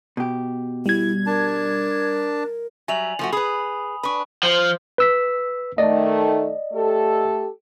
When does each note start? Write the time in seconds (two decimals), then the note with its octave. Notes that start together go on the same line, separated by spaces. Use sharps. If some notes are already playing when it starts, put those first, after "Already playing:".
0.17 B2 G4
0.86 G3 E4 G#6
1.26 D4 A#4 A5
2.88 F#3 G3 E5 G#5 F7 F#7
3.19 F3 A3 F#4
3.32 G#4 B4 B5 D#6
4.03 D4 B4 B5 C#6
4.43 F3
4.98 B4 E6 B6
5.78 D#3 A3 D5 D#5
6.73 A3 G4 A4